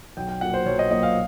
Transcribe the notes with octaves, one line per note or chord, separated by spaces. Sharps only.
B1 G5
G5
A#2 F#3 A#3 F#5
C5
B1 C#5
D#5
A#2 F#3 A#3 D#5
F5